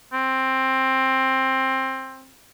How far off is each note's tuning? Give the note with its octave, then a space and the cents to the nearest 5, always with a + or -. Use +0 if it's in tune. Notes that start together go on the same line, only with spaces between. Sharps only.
C4 +15